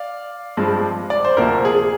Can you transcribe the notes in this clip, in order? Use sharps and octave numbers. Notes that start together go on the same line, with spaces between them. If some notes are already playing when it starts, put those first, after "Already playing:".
Already playing: D5 F5
G2 F3 G#3 C4
D5
C5
D2 C3 F3 A#3 A#4
G#4